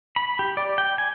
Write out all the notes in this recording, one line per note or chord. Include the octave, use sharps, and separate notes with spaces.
B5
G4
D5
G5
G#5